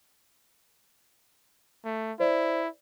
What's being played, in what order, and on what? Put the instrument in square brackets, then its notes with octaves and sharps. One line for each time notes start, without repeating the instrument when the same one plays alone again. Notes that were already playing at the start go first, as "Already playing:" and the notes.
[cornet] A3
[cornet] E4 [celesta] C5 D5